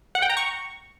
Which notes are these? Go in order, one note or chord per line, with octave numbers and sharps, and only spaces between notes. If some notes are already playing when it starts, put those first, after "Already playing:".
F#5
G5
A#5
C#6